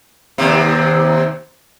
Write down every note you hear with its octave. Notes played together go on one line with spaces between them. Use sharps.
D#2 C3